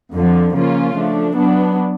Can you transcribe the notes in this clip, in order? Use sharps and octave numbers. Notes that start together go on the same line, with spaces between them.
F2 D3 F3
C#3 F3 A#3 C#4 F4
F3 A3 D4
F#3 B3 D4